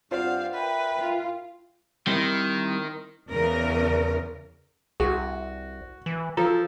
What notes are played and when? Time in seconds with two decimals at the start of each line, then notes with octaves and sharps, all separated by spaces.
0.11 G2 C4 F4 C5 D5 F5 F#5
0.53 A#4 B4 E5 G5
0.98 F4
2.07 D#3 G3 C4 E4
3.30 E2 C#3 A#4
5.00 C2 F#4 G#4
6.06 E3
6.37 F3 A4 A#5